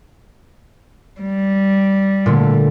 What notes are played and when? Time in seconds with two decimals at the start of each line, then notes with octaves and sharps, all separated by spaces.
1.21 G3
2.26 A#2 D3 A3